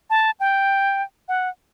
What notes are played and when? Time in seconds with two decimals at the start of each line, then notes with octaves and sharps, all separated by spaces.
0.10 A5
0.40 G5
1.28 F#5